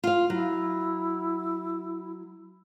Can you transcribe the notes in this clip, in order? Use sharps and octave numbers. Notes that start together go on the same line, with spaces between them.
F4 F5
F#3 E4